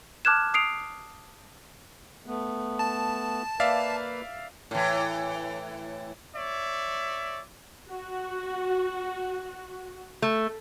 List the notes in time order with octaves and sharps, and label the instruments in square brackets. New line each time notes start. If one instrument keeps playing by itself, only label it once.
[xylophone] A5 D6 F6 F#6 G#6 E7
D#6 C7 D7 F7
[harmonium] A3 B3
[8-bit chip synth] A5
[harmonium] A#3 B4 [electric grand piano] D5 E5 F5
[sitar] A2 E3
[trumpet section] C#5 D5 E5
[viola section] F#4
[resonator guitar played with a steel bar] A3